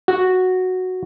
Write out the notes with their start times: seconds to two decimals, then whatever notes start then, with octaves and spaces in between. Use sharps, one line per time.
0.08 F#4